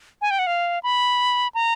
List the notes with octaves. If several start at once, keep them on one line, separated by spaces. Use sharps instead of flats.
G#5
G5
F#5
F5
B5
A#5